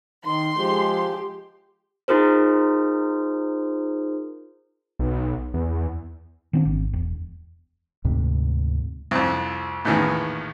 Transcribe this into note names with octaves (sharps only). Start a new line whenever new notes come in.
D#3 C6
F3 G#3 G4
D#4 F4 G#4 A#4 C5
B1
E2
D#3 B3 C4 D4
G#1
E1
D2 G#2 C3
C2 F2
A#1 E2 A2 D#3 E3